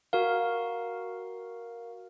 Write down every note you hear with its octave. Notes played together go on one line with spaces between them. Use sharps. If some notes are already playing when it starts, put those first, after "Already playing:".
F#4 A#4 F5